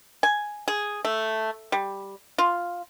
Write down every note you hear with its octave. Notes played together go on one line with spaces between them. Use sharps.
G#5
G#4
A3
G3
F4